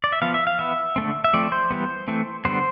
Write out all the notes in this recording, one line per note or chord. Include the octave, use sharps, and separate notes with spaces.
D5
E5
F3 B3 F5
E5
F5
E3 B3 E5
D3 A3 C4
E5
F3 A3 C4 D5
C5
E3 G3 B3
E3 A3 C4
D3 G3 B3 C5